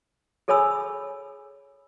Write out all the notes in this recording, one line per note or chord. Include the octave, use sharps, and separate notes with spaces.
G#4 A4 C#5 G#5 B5 E6